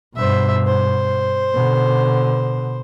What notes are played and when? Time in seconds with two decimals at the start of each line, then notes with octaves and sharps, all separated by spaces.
0.16 G2 B2 C5 E5
0.67 C5
1.55 B2 D3